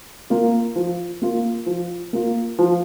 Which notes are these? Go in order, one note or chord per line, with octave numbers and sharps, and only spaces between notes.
A#3 F4
F3
A#3 F4
F3
A#3 F4
F3